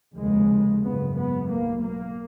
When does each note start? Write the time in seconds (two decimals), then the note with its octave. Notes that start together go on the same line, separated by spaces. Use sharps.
0.16 F1 D#2 C#3 G#3
0.83 G#1 F#2 C#3 B3
1.17 B3
1.50 B1 B2 A#3
1.83 A#3